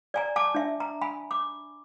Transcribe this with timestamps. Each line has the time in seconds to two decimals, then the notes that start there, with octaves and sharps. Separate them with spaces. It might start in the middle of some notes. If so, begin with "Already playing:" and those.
0.14 D5 G#5 A#5
0.36 G#5 A5 D6
0.55 D4 E5
0.80 A#5
1.01 G#5 B5
1.31 D6